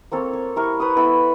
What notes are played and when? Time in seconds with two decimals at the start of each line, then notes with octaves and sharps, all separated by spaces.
0.12 A#3 C4 A4 C#5
0.33 C#5
0.56 G3 E4 A#4 C#6
0.80 B4 C#5 D#6
0.96 B3 E4 A4 B5